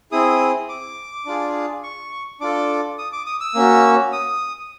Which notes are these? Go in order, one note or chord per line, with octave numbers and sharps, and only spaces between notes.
C4 E4 G#4 D#6
D6
D4 F4 G#4
C#6
D4 F4 A4 D6
D#6
D6
D#6
E6
A#3 C#4 F#4
D#6